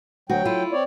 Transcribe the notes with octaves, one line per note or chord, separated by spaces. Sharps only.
D2 F#3 F#4 G5
E4 F4
C4 C#5 D5